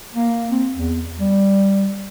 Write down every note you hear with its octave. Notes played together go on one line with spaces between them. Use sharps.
A#3
C4
E2
G3